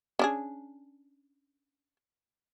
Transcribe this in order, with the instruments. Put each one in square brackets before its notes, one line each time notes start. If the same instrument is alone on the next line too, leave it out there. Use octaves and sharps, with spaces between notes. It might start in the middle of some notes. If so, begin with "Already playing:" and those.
[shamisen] C#4 D4 G#4